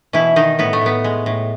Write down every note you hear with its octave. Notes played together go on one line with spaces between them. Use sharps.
B2 E3 E4
B2 D#3 D#4
A2 B3
A3
A2 B3
G#3
A2